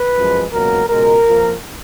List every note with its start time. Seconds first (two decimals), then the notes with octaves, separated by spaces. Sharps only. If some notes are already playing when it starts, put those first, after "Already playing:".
Already playing: B4
0.17 F#2 F3 G#3
0.53 C#2 B2 F#3 A#3 A#4
0.89 C#2 B2 G#3 A#4
1.26 F2 F3 A#3